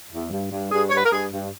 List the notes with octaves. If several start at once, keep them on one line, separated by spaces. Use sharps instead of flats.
E2
G2
G2
G2 G#4
G2 C#5
B4
A#4
G2 G#4
G2